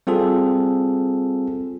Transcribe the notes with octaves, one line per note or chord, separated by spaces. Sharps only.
G3 C4 F4 G#4 A4